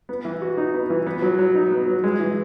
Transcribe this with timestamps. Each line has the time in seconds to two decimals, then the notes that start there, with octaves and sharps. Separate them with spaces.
0.09 B3
0.25 E3
0.42 F#4
0.58 D#4
0.74 B3
0.90 E3
1.07 B3
1.22 F#3
1.39 F#3
1.55 D#4
1.71 B3
1.87 F#3
2.04 G#3
2.20 E3